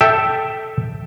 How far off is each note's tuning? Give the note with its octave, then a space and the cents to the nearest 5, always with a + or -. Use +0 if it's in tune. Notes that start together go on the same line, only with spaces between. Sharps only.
A4 +0 E5 +0 G5 +0